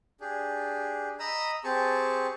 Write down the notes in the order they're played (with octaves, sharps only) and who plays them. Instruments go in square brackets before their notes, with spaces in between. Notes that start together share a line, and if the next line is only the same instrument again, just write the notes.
[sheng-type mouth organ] D4 G4 G#4
D#5 A#5 B5 D#6 E6
C4 G4 G#4 A5 C#6